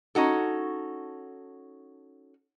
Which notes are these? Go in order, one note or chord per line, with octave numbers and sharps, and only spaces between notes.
C#4 D#4 F#4 A4